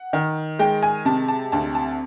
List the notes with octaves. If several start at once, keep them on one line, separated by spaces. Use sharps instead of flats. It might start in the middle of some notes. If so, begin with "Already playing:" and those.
Already playing: F#5
D#3
G#3 G5
G#5
C3 A5
A5
D2 A5
A5